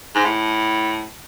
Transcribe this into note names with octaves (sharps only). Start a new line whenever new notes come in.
G#2
A2